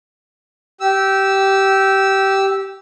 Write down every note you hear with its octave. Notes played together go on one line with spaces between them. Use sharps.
G4 E6